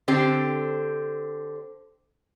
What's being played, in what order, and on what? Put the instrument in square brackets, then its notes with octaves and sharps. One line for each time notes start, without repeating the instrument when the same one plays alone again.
[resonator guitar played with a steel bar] D3 C4 G4